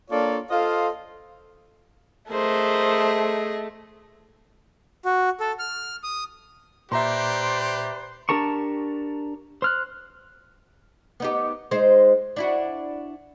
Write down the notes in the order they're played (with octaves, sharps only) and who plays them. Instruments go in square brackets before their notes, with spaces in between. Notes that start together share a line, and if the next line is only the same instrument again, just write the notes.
[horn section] A#3 D4 F4 A4 C#5 D5
F4 A4 C5 D#5 F5
[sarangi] A3 [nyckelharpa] G#4 D#5 [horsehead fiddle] A#4 C5
[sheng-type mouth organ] F#4
A4
F6
D#6
[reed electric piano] A#2 [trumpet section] G4 B4 D5 [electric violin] C5 [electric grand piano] E5 A#5 C6
[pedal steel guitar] D4 G4 A#4 A5 C#6
C5 F6 F#6
[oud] B3 D#4 G4
G#3 D#4 C5
D4 E4 F#4